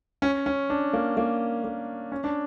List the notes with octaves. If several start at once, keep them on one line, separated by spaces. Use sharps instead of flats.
C#4
C#4
D4
A#3
A#3
A#3
C#4
D4